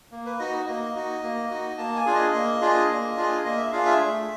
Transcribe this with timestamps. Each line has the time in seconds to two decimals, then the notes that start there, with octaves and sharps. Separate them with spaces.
0.11 A#3
0.26 B4
0.39 D#4 F#4 D#5
0.67 A#3 D#5
0.95 D#4 F#4
1.23 A#3
1.51 D#4 F#4
1.78 A#3 A5
1.96 G#5
2.06 D4 F4 G#4
2.15 D#5
2.34 A#3
2.61 D4 F4 G#4
2.89 A#3
3.16 D4 F4 G#4
3.45 A#3 D#5
3.57 E5
3.72 D4 F4 G#4 F5
3.86 E5
3.99 A3